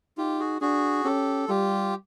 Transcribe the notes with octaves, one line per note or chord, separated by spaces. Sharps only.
D#4 F4 G4
F#4 G#4
D4 F#4 G#4
C#4 G4 A4
G3 F4 G4